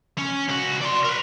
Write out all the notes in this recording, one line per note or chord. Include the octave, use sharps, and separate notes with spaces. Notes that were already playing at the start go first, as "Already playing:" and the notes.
C#4
C#2 F#4
D5 C6
A#4 B4